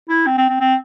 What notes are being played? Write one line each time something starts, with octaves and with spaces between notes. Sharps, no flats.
E4
C4
C4
C4
C4